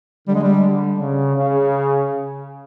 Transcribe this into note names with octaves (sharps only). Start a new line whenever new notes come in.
D3 G3
G#3
G3
C#3
C#3